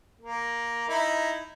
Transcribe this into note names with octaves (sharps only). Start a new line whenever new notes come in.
A#3
D#4 E4